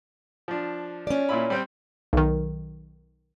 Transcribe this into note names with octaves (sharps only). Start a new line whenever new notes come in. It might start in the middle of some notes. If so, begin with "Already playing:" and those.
F3 D4
C#4 D5
A#2 E4 B5
G3 C4 G5
B1 D#3